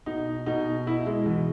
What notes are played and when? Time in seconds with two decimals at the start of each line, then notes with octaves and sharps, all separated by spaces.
0.06 B2 D#4
0.46 B2 D#4
0.87 B2 E4
1.06 G#3
1.26 B2 E3